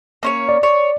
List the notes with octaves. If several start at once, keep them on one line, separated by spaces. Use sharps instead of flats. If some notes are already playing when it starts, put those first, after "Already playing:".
A#3 C#4 C#5
D5
C#5 D5